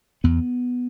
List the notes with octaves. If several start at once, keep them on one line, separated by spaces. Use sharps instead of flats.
E2 B3